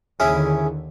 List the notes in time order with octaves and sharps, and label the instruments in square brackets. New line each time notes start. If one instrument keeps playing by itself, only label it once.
[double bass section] D#2 D3 [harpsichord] C#4 E4 [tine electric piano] G#4